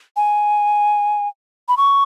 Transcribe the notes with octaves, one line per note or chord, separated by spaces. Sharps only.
G#5
B5
C#6